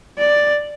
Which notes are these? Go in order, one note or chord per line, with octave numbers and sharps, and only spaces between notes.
D5